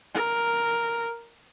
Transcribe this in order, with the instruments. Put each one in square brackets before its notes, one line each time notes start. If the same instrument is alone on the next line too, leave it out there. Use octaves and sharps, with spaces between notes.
[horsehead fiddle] A#4